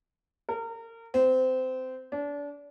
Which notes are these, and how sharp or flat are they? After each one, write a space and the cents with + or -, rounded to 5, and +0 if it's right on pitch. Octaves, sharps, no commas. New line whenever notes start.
A#4 -30
C4 -20
D4 -30